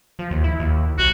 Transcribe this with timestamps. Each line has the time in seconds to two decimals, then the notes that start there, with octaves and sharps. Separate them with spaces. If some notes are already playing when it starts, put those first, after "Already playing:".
0.19 F3
0.31 D#2
0.44 E4
0.60 D#2
0.98 B1 F#4